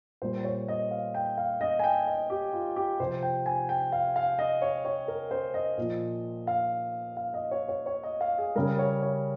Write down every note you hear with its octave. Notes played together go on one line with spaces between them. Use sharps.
A#2 G3 C5
C#5
D#5
F5
G5
F5
D#5
G#5
G5
D#5
G4
F4
G4
C3 F3 C5
G5
G#5
G5
F5
F5
D#5
C#5
C#5
A#4
C5
D#5
A#2 F3
F5
F5
D#5
C#5
C#5
C#5
D#5
F5
G#4
C#3 G3 A#4
C#5
C#5